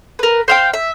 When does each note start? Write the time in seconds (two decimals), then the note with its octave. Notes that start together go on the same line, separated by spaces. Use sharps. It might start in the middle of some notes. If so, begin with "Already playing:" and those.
0.19 A#4 B4
0.48 C5 F5 G5
0.73 E5